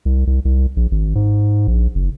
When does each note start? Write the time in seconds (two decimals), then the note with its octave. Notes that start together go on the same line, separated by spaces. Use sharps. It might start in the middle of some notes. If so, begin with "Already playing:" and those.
0.05 C2
0.27 C2
0.45 C2
0.76 A#1
0.91 G#1
1.15 G#2
1.68 A#1
1.95 F#1